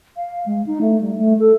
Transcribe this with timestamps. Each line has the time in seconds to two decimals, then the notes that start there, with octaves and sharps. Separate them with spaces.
0.16 F5
0.46 G#3
0.67 D#4
0.81 A3
1.01 G3
1.18 A3
1.39 A4